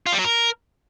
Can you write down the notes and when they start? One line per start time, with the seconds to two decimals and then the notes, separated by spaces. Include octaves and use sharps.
0.06 F4
0.13 G3
0.19 F#3
0.25 A#4